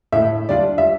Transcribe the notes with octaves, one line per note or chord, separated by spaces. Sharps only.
A2 E5
G3 D4 F4 D5
E5